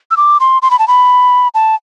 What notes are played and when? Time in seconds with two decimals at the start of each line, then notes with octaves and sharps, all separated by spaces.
0.11 E6
0.17 D6
0.40 C6
0.62 C6
0.71 B5
0.79 A5
0.88 B5
1.54 A5